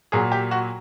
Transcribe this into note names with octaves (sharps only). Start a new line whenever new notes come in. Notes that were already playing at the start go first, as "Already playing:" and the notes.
A#2 F#3 G#4
G4
F#4